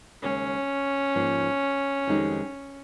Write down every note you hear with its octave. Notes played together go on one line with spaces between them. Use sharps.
D#2 C#3 G#3 C#4
G#2 F3 A#3 D#4
F2 D#3 G#3 D#4 G4